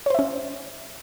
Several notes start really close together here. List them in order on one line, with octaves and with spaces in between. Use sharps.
C#5 C5 E5 C#4